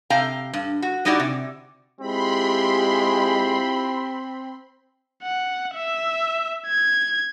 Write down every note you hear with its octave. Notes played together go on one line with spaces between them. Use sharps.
C3 F5 G5 A#5
G2
F#4
G3 D#4 E4 F#4 G4 D5
C3
G#3 C4 E4 F4 G4 B5 C6
F#5
E5
G#6